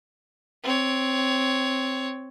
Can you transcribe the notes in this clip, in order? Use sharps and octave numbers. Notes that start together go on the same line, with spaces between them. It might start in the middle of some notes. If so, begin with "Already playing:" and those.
C4 C#5